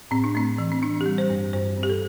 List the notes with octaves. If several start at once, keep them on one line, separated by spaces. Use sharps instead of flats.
A2 C4
D4
A3 C4
E3
C4
C4 D4
G4
G3
C5
G2
G2 C5
C4
G4
A4